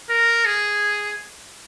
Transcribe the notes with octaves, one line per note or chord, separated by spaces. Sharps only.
A#4
G#4